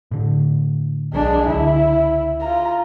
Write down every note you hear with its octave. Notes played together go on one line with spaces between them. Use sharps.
A2 D3
B1 F#3 G#3 D4
C#2 D3 E4
F4 A#5